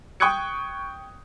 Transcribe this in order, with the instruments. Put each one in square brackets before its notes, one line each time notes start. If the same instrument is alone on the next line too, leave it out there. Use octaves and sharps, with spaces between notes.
[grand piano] G5 C#6 D#6 F#6 G#6 C#7